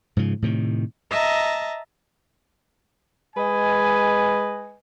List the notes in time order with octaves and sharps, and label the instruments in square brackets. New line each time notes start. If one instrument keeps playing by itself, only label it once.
[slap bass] G#2 C#3 F3
A2 C3 D#3
[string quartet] D#5 E5 A5 A#5
[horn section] G#3 B4 D#5 G#5